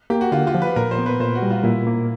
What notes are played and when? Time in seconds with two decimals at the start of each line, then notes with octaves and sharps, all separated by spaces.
0.10 A#3 G4
0.21 F#4
0.32 D3 F4
0.47 F4
0.55 F3
0.62 B4
0.76 A#2 A#4
0.91 C5
0.99 B3
1.06 B4
1.20 A#2 C5
1.35 F#4
1.42 G3
1.50 F4
1.64 A#2 E4
1.87 A#3